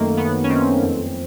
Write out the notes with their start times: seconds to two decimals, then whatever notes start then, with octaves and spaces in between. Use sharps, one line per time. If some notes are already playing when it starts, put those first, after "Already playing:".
Already playing: F#2 D#3 A3 A#3
0.17 F#2 B3
0.44 C#4
0.49 D#3 C4
0.82 F2